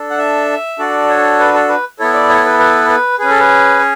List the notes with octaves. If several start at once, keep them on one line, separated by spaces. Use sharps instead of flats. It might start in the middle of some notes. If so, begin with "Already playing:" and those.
Already playing: D4 A4
F#5
E5
D4 F#4 A4 D5
C#5
B4
A4
B4
B3 E4 A4 C#5
D5
C#5
B4
B4
B4
C#4 G#4 B4
A4
B4
C#5